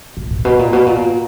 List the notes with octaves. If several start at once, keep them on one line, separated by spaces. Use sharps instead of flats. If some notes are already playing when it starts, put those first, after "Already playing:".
A#2
A#2
B2
A#2
B2
A#2